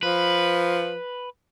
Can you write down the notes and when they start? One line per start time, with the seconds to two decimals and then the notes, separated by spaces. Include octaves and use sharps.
0.03 F3 B4